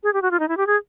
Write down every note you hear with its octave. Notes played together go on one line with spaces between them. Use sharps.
G#4
G4
F#4
F4
D#4
E4
G4
G#4